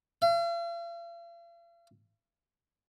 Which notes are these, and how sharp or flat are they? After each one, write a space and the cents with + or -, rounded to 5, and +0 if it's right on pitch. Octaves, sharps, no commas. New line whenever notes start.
F5 -45